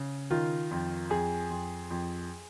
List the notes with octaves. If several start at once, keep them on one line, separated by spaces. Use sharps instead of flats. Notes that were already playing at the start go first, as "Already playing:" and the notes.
Already playing: C#3
D#3 F4
F2
F2 G#4
F2
F2